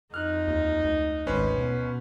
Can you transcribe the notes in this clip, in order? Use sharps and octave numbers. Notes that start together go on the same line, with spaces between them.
F2 D#4 F6 F#6
D#2
D2
G#1 C#4 B4 C5
B2